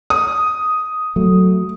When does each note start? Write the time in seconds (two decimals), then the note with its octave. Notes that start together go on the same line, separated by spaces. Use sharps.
0.10 D#6
1.16 F#3 A3